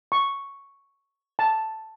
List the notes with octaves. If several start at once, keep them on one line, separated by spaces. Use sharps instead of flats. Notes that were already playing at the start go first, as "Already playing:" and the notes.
C#6
A5